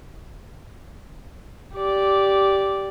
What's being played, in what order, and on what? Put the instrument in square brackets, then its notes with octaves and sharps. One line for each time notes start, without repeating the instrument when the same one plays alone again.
[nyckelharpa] G4 D5